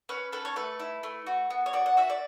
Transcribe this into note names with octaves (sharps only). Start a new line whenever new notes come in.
C#4 B4
A4 B4
C#5
A3 B4
E4
A3
F#4
B3
C#5
F#4 D5
F#5
F#4 E5
D5